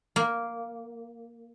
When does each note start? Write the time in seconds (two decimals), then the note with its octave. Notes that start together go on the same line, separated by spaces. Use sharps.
0.16 A#3